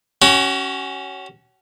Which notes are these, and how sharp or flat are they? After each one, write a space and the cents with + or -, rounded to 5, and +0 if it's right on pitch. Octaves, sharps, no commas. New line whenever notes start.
C#4 +0 F#4 +35